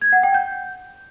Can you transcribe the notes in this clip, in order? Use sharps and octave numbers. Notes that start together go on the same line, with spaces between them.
G#6
F#5
G5
G6